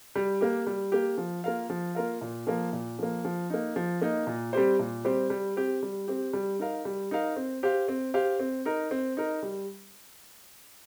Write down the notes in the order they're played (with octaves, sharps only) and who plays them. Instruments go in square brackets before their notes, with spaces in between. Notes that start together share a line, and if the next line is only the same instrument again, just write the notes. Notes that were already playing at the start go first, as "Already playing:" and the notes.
[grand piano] G3
A#3 G4
G3
A#3 G4
F3
A#3 F4 A#4 F5
F3
A#3 F4 A#4 F5
A#2
F3 A#3
A#2
F3 A#3
F3
A#3 D#4
F3
A#3 D#4
A#2
G3 C4 G4 C5
A#2
G3 C4 G4 C5
G3
C4 G4
G3
C4 G4
G3
D#4 A#4 F5
G3
D#4 A#4 F5
C4
G4 C5 F5
C4
G4 C5 F5
C4
D#4 A#4
C4
D#4 A#4
G3